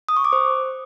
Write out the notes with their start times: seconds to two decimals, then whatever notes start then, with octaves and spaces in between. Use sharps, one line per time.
0.09 D#6
0.17 C#6
0.25 D6
0.33 C5